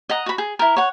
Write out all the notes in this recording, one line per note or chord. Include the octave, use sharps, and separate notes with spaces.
D#5 F#5 A#5
F#4 B5
G#4
E4 A#4
C#5 F#5